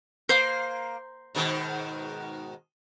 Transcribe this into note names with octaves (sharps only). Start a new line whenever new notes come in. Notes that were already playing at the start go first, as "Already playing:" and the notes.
A#3 C5 C6
G#2 B2 D#3